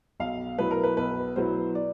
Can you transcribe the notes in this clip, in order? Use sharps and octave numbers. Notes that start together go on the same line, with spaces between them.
B1 F5
B2 F#3 B3 E4 B4
A#4
B4
B1 B4
B2 F#3 B3 E4 C5
D5